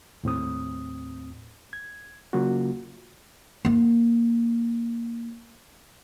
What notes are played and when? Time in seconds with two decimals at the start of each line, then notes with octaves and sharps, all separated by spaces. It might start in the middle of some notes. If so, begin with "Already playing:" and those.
0.23 D#2 A2 C4 D#6
1.73 G#6
2.33 C#3 F#3 A#3 F4 F#4
3.65 A#3 D#4